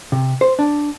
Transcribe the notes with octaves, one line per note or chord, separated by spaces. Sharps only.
C3
C5
D4